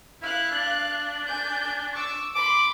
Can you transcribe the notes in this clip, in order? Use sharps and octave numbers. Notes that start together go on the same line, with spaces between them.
E4 F5 F#6
D4
G#5 G6
C#6 D6 E6
B5 C6 D6